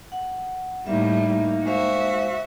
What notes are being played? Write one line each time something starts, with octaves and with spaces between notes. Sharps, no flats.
F#5
A2 G3 A#3 D#4 E5
G#3 F#4 C5 E5 F5